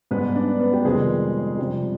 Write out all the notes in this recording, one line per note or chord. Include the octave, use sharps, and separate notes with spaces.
G#2 G3 B3 B4
D4 D5
B3 B4
G4
F2 C3 D#3 G3 G#3 C4 G#4
F2 C3 G3